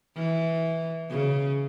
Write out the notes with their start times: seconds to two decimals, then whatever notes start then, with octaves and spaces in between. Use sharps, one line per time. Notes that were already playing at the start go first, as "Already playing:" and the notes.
0.16 E3
1.10 C#3